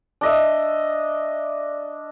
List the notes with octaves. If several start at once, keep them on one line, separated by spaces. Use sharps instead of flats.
D4 D#5 E5